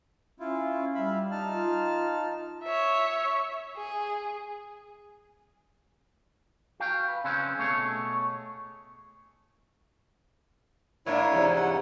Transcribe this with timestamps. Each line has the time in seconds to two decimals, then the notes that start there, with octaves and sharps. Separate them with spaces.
0.40 C#4 E4 F4
0.95 G3 E5 F5 B5
1.31 D#4 A5 F6
1.52 F4
2.64 C#5 E5
3.77 G#4
6.80 F#4 F5 G5
7.08 B4
7.24 C#3 C4 C#4 B4 C5
7.58 B2 A3 G#4 C#5
11.06 G#2 A#3 D4 E4 C#5
11.32 E2 G#2 C3
11.56 F#5